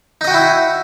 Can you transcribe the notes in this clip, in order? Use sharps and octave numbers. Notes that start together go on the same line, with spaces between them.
D#4 E4 F#4 D#5 G5